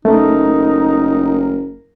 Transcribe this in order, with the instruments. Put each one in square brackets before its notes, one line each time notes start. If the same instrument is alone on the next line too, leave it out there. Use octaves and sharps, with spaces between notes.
[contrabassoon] F#1 [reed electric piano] A3 [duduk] D#4 [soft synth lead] A#4